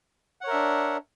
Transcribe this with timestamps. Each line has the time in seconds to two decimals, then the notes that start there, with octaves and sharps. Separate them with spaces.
0.41 F#5
0.44 C#5
0.47 A#4
0.50 E5
0.53 D4